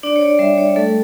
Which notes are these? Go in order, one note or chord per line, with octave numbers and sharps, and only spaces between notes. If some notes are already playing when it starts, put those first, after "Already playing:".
D4 D5
C#5
D5
G3 E5
C#5
A3 A4